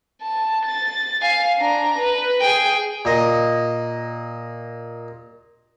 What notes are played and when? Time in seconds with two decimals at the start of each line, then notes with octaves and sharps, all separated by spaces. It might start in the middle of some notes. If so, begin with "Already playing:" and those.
0.22 A5
0.65 A6
1.21 F5 G#5
1.58 D4 A#5
1.99 B4
2.41 G#4 G5
3.05 A#2 D#5